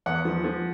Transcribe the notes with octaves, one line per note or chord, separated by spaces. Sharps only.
E2 F#5
F3
F3